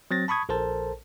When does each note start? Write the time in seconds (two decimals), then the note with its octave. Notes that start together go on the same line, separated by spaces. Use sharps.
0.11 F#3 C4 A6 A#6
0.28 A5 B5 C#6 D#6 G#6
0.49 A#1 A4 A#4 C5 A5